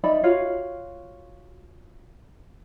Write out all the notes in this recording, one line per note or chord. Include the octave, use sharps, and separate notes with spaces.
D#4 D5 E5 B5
F4 F#4 C#5 F5